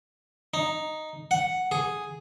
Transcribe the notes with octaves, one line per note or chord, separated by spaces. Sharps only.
D#4
F#5
G#4